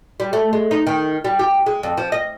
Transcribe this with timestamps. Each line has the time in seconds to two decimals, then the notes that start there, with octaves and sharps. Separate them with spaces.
0.20 G3
0.33 A3
0.53 G#3
0.71 D#4
0.87 D#3
1.24 G3
1.39 G4
1.66 G#3
1.83 F2
1.97 F3
2.12 D#5